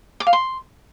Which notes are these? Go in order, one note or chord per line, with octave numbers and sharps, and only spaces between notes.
D6
F5
C6